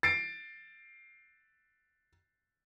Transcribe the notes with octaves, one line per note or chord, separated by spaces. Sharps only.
A6 C7 D7